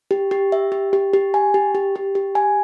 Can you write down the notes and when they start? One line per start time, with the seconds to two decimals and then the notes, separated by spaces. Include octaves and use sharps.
0.11 G4
0.31 G4
0.52 E5
0.72 G4
0.93 G4
1.14 G4
1.34 G#5
1.54 G4
1.75 G4
1.96 G4
2.15 G4
2.35 G#5